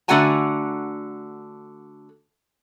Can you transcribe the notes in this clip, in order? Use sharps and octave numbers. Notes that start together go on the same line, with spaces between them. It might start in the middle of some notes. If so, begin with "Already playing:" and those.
D3 A3 F#4 F#5 G#5 A#5